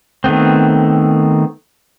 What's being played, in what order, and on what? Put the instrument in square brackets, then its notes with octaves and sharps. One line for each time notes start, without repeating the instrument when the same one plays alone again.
[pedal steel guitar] D#3 A3 B3 C4